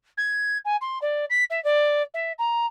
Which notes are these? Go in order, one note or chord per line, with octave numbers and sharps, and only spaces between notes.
G#6
G#5
C6
D5
B6
E5
D5
E5
A#5